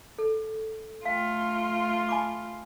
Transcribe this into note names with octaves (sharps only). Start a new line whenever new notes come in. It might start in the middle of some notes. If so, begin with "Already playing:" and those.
A4
A3 F4 F5 G5
G#5 B5 D6